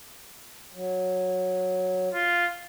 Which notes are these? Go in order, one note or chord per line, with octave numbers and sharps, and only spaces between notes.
F#3
F4